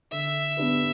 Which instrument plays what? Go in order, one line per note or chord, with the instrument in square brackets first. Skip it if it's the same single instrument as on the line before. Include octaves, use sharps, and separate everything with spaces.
[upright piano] D3 [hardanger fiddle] E5
[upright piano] B3 D4 G4 B4